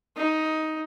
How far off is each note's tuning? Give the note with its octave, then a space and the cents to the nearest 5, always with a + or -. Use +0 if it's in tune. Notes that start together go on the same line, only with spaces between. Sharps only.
D#4 +10